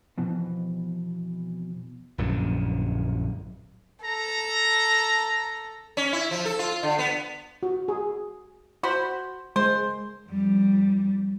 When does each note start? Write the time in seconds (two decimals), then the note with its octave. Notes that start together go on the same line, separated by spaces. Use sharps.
0.18 F2 B2 E3
2.18 A#1 F#2 A2 D3
4.05 A4 A#5
5.97 C#4
6.13 E4
6.31 F3
6.45 A4
6.59 F4
6.83 D3
6.99 B3
7.63 F#4
7.88 G#4
8.83 F#4 C5 B5
9.56 G#3 C5
10.29 F2 G3